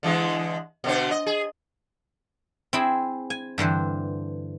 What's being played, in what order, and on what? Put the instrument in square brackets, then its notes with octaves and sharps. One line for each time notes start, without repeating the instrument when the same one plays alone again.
[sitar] D3 E3 G#3
B2 D3 C5
D#5
G#4
[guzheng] C4 E4 G#4
G#5
G2 D3 E3 C5